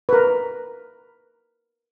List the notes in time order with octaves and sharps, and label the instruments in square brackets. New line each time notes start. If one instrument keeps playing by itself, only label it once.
[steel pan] A#4 B4